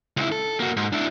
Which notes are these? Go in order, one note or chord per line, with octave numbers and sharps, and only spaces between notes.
C#2 E4
A4
A#3 F#4
G#2
D4 E4